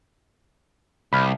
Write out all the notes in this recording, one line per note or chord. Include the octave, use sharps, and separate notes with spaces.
C2 B5 F6